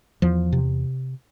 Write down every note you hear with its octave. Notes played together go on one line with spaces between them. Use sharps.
E2 F3
C3